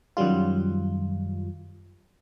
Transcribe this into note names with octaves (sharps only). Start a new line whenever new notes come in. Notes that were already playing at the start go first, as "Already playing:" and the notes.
F#2 D#3 F#3 G3 F4